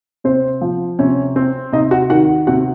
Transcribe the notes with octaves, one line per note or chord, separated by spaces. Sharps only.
C3 C4 C5
F3
C3 C#4 C#5
C4
C3 D#4 D#5
F#4 F#5
D#3 F#4 F#5
C3 F#4 F#5